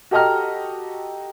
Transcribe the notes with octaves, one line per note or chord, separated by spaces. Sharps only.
F#4 G4 A4 D#5 A#5 F6